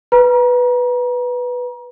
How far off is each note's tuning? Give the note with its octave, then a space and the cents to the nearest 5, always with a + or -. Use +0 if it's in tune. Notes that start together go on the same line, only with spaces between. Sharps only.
B4 +0 A#5 +35